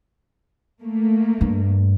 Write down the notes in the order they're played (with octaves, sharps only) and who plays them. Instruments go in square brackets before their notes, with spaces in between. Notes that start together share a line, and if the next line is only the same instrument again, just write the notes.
[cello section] A3 A#3
[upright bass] G2